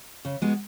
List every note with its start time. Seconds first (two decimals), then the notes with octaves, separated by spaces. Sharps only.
0.25 C#3
0.42 G#3 B3 F#4